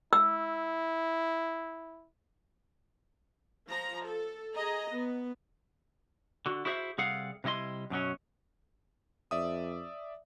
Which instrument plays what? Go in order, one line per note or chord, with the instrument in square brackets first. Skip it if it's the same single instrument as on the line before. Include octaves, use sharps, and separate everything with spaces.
[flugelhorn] E4 [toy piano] E6
[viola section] F3 A#5
A4
G#4 D#5 A#5
B3
[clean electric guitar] D3 F#4
E4 F#4 G#4 C5 D5 E5
C3 G3 G#4 A4 F5 F#5
C3 G3 E4 D#5 C6
F#2 B2 F#3 C#4
[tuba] F2 [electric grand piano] D5 E5 D#6